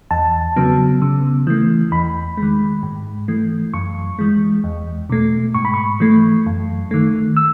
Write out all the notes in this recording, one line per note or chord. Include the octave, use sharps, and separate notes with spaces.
E2 A5
C#3 F#3 B3
C#3
E3 A3
E2 B5
G#3
D#3
G#2
E3 A3
F#2 C#6
E3 G#3
E2
B2 A3
G#2 C#6
B5
C#6
E3 A3
F#2
D#3 A3
E6